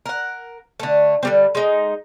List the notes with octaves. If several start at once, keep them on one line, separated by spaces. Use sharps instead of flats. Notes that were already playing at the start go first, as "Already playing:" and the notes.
A#4 F#5
D3 A3
D3 G3 C4
G#3 D#4